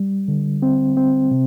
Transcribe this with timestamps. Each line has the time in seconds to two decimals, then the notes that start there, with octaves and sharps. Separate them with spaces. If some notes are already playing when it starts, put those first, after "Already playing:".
Already playing: G3
0.28 D3
0.62 C4
0.97 C4
1.31 C3